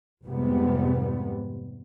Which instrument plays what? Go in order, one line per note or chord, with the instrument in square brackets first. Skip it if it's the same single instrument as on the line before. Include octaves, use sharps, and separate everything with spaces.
[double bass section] F1 F2 G#2 C3 G3 B3